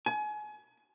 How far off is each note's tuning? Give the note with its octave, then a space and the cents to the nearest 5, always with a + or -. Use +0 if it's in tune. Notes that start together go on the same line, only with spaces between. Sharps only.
G#5 +30